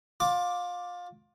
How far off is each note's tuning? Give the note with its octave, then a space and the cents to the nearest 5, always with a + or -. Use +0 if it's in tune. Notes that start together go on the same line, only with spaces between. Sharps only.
F4 +25 D6 +0